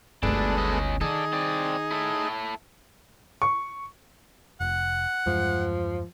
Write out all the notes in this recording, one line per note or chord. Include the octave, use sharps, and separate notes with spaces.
G1 D2 G#3 A3 B3 D4
C#4 D#5
D#3 D#4 G#4 A4 D5
C4 D5
E4 A4
C#6
F1 F#5
E2 G2 F3 G#3